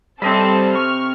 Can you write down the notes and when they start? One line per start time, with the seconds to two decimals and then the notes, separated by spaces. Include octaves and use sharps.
0.22 C3 G3 C4 A4 D#5 A5 B5
0.75 C#6 F6